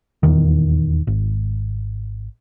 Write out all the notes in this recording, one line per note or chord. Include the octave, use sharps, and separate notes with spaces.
D#1 E2 D#3
G#1